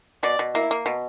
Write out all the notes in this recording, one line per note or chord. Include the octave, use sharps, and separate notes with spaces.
B2 D5
B2
A#3 E4
A#3
B2